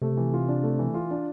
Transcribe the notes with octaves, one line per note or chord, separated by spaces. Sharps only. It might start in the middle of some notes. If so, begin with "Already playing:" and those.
C3 A3
E3
F4
D4
A3
E3
F4
D4